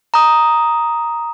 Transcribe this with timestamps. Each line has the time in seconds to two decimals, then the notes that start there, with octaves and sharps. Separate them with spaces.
0.14 A#5 D#6